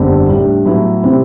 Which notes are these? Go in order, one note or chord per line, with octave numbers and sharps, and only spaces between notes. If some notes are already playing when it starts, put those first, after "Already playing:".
Already playing: F#1 E2 D3 G3 C4
A2 G3 D4
A2 F#3 B3 E4
C3 G3 C4 E4